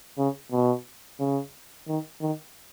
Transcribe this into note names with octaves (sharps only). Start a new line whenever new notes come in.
C#3
B2
C#3
D#3
D#3